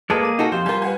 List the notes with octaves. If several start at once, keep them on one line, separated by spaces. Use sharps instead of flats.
G#3 A#3 G#4 A4 B4 D5
D6 D#7
D#4 F#4 A4
F2 G4 C5 F5
G3 F4 A#4 G#5
B4 F#5 G#5